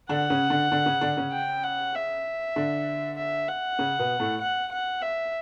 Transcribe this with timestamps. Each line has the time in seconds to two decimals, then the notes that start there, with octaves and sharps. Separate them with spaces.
0.09 D3 D4 F#5
0.30 C#3 C#4
0.50 D3 D4
0.72 D3 D4
0.86 C#3 C#4
1.01 D3 D4
1.17 C#3 C#4
1.32 G5
1.63 F#5
1.95 E5
2.56 D3 D4
3.17 E5
3.49 F#5
3.79 C#3 C#4
3.99 B2 B3
4.20 A2 A3
4.41 F#5
4.71 F#5
5.02 E5